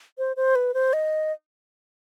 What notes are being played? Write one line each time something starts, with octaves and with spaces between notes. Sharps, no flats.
C5
C5
B4
C5
D#5